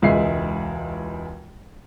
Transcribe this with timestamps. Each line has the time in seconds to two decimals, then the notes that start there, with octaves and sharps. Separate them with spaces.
0.02 E1 C#2 G#3 E5 C7